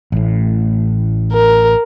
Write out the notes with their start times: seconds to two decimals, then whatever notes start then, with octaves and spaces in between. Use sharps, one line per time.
0.12 A1 A2
1.33 A#4